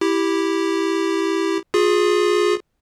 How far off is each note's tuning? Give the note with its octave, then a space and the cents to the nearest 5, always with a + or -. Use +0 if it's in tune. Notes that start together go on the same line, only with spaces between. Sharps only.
E4 +0 G4 +0
F4 +30 G#4 +0